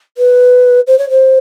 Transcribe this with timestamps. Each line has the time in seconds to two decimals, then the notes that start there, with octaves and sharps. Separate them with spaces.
0.18 B4
0.87 C5
0.98 C#5
1.10 C5